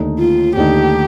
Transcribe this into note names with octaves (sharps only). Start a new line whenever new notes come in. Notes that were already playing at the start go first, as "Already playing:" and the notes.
Already playing: D#2 D3 A3 D#4
F4
D#2 D3 A3 D#4 G4